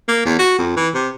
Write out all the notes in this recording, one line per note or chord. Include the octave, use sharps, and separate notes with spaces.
A#3
E2
F#4
F2
E3
C3